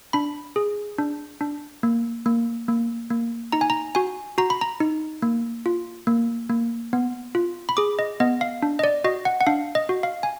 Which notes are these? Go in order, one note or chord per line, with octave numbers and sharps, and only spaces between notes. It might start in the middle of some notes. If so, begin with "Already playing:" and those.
D4 B5
G#4
D4
D4
A#3
A#3
A#3
A#3
D#4 A#5
G#5
A#5
F#4 G#5
F#4 A#5
B5
A#5
D#4
A#3
F4
A#3
A#3
B3
F4
B5
G#4 D6
D#5
B3 D#5
F5
D4
D#5
D5
F#4 D#5
F#5
F#5
D4 F5
D#5
F#4
F5
G#5